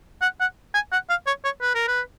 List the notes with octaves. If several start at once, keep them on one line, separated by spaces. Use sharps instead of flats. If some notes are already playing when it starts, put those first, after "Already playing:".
F#5
F#5
G#5
F#5
F5
C#5
C#5
B4
A#4
B4